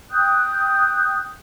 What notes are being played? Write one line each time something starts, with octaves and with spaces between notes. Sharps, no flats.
G5 D#6 F#6 G6